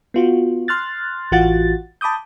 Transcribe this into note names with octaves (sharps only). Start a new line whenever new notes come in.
B3 F4 F#4
C6 F6 F#6 A6
A1 E3 F4 F#4 F#5 A6
A5 B5 D6 D#6 G6